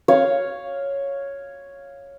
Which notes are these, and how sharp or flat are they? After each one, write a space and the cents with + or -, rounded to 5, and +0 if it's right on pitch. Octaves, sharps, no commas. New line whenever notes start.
C#5 +0 F5 +0